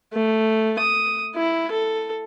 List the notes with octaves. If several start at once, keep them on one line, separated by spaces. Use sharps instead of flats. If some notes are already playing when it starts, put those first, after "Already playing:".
A3
D#6
E4
A4